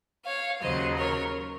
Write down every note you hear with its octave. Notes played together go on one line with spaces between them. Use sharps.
C#5 F5
D#2 C#3 F#3 C5 D#5
A#4 C#5